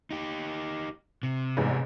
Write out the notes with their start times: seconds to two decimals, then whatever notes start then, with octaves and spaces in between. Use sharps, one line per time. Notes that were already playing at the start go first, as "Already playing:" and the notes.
0.11 D#4 G4
1.23 C3
1.57 A1 E2 G#2